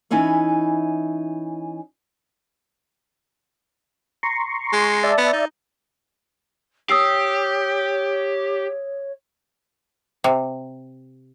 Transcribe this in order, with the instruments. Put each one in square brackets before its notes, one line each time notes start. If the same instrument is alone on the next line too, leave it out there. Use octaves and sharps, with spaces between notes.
[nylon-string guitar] E3 C#4 D#4 E4 C#5
[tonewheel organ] A#5 C6 C#6
[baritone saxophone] G#3
[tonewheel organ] D5 E5 A5
[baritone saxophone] B3
D#4
[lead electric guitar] G4 [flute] C#5 [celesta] D#6 E6 C7
[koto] C3